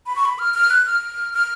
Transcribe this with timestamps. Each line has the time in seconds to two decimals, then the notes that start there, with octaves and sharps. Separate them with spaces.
0.06 B5
0.16 C#6
0.25 B5
0.39 F6
0.54 F6
0.70 F#6
0.86 F6
1.33 F6